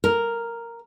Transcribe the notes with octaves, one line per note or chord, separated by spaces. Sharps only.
A#4